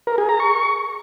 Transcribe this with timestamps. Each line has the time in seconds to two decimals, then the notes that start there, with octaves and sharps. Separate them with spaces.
0.07 A#4
0.18 G#4
0.29 A#5
0.40 C#6